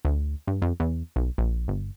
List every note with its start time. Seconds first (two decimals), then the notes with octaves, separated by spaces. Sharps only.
0.05 D2
0.47 G2
0.62 F2
0.80 E2
1.16 B1
1.38 A#1
1.68 G1